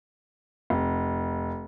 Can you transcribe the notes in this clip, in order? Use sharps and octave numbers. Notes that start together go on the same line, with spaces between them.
F1